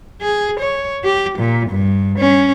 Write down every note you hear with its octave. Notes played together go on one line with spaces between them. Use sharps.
G#4
C#5
G4
A#2
G2
C#4